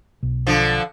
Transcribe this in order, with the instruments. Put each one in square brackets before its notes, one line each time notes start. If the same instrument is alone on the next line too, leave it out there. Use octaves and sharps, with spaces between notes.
[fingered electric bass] B1
[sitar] D3 F3